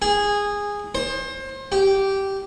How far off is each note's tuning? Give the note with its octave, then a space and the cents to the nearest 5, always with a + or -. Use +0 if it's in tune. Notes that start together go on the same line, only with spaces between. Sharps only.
G#4 -15
C5 +30
G4 -10